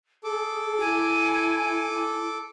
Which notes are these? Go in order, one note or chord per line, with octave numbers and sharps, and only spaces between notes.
G#4 A4 D6
E4 G#5